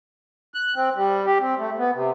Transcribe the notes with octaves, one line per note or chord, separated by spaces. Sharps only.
F#6
C4
G3
G4
C4
A3
B3
C3